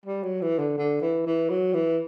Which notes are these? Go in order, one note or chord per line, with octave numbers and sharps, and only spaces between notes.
G3
F#3
E3
D3
D3
E3
E3
F#3
E3